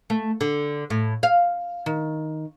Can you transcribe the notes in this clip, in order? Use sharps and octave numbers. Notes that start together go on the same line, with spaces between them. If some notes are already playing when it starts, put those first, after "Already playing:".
A3
D3
A2
F5
D#3